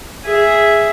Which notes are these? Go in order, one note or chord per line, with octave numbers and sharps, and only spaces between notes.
G#4 E5